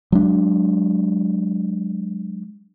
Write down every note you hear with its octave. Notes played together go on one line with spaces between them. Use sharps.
F#3 G#3 D4